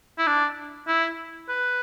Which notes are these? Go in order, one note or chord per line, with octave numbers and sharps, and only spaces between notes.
E4
D4
E4
B4